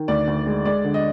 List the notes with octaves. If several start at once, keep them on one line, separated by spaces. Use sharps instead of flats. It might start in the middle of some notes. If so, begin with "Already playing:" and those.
Already playing: D#3
D2 D5
D2
G#3
G#3 D5
D3
D#5